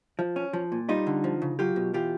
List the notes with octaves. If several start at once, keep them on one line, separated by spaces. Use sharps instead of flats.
F3
C#4
F3
A#2
G3 D#4 F4
D3
F3
C#3
F#3 F4 G4
B2
E3 F4 G4